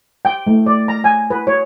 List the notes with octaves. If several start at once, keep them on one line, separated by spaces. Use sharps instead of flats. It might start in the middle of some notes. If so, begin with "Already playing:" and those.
G5
A3
D5
A#5
G#5
B4
C#5